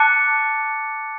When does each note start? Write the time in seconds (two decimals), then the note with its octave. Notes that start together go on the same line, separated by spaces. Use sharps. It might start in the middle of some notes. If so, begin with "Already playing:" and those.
Already playing: A5 D6 F#6 A6 C#7